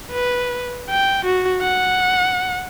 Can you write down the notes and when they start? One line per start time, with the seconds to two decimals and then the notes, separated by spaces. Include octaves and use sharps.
0.11 B4
0.90 G5
1.25 F#4
1.61 F#5